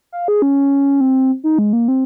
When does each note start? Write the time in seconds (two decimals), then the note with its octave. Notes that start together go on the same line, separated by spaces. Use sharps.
0.12 F5
0.28 G#4
0.42 C#4
1.01 C4
1.44 D#4
1.59 G#3
1.73 A#3
1.88 C4